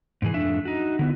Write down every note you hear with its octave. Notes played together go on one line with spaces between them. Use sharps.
G#2 C3 E3 G#4
F2 A3 D4 E5
D#4 F#4
D3 B3 E4